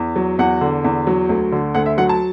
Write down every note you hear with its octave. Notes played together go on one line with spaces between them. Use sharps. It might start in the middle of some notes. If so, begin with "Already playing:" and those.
Already playing: E2
F#3
E2 F#5
D3
E2
F#3
D2
D3
D2 F#5
E5
F#3 F#5
A5